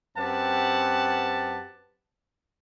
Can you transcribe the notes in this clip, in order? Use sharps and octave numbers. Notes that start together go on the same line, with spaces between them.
F#2 C4 G4 B4 F#5 A5